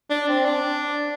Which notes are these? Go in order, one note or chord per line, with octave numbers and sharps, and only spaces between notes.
D4
C4
D4